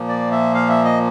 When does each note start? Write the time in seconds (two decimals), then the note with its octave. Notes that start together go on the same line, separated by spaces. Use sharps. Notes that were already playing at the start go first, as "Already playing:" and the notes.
Already playing: A#2 F3 A#3
0.08 D5
0.32 E5
0.54 F5
0.69 E5
0.85 D#5